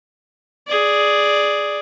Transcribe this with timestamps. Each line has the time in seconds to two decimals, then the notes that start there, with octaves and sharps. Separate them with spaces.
0.67 G#4 D5